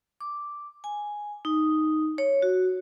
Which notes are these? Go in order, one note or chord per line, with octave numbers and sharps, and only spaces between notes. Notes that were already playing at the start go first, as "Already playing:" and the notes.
D6
G#5
D#4
C#5
F#4